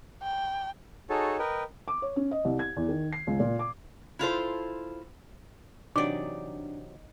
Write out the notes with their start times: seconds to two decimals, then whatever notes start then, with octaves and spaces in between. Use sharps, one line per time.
0.22 G5
1.10 D#4 F#4 G#4 A4 C#5 A5
1.39 A#4 B4 D#5 G5
1.88 D6
2.02 C#5
2.16 C#4
2.31 D#5
2.45 C2
2.59 G#6
2.76 E2
2.88 D#3
3.13 C7
3.27 C#2
3.39 A#2
3.59 D6
4.19 E4 F4 A4 C5
5.96 C3 E3 F#3 D4 D#4 D5 D6